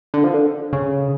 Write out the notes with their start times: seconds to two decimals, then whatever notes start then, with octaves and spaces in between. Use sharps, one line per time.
0.14 D3
0.24 F3
0.34 D3
0.73 C#3